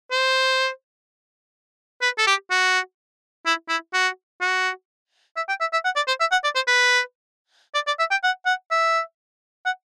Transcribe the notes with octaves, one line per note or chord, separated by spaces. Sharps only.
C5
B4
A4
G4
F#4
E4
E4
F#4
F#4
E5
G5
E5
E5
F#5
D5
C5
E5
F#5
D5
C5
B4
D5
D5
E5
G5
F#5
F#5
E5
F#5